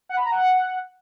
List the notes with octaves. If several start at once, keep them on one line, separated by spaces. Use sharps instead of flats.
F#5
B5
A#5
F#5